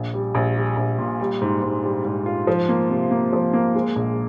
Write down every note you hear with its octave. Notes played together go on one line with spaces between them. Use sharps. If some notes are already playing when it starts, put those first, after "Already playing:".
Already playing: A#1
G3
A#1
G3
A#1
A#2
G3
G#2
G#2
G3
G#2
F4
F3
A#3
C3
A#3
F3
A#3
G#3
A#1